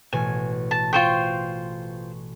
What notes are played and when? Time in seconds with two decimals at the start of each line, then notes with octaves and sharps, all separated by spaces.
0.13 A1 B2 G#5
0.71 A5
0.93 F4 C5 G5 C#6